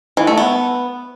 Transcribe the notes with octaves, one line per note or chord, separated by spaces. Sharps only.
E3
A3
B3